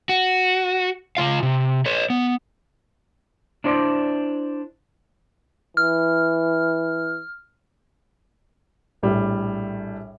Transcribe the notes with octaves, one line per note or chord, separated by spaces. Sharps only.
F#4
C#3 F3 F4 F5
C3
B4 C#5
B3
D4 E4 C5 D5
E3 F6
A#1 A2 G3